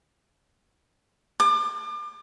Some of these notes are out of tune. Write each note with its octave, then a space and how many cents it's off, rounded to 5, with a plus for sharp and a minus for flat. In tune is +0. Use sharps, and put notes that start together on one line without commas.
D6 +35